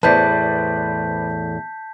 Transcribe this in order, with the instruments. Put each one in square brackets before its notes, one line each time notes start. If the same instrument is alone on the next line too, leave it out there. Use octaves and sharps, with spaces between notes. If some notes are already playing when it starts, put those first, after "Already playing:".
[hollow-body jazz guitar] E2 A2 [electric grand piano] B4 C5 D5 [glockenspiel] A5 G6 B6